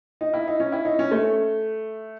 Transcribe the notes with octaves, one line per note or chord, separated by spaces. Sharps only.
D#4
E4
D#4
C#4
E4
D#4
C#4
A3